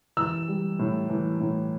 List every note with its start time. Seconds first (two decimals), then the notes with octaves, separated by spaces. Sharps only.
0.17 E3 E6
0.48 G3
0.79 A2
1.10 E3
1.40 A2